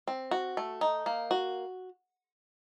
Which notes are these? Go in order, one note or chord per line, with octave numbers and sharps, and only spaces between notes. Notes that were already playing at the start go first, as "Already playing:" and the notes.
C4
F#4
A3
D#4
A#3
F#4